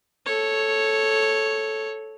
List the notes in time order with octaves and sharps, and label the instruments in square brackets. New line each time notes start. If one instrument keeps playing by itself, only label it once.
[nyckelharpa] A4 C#5